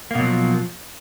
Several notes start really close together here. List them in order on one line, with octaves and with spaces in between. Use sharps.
A#3 B2 F#3 F3